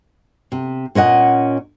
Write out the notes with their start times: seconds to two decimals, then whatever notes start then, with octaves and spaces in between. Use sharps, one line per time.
0.52 C3
0.95 A#2 C#4 D#5 F#5